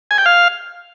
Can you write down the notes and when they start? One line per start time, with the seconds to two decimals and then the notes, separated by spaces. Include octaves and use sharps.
0.11 G#5
0.18 G5
0.26 F5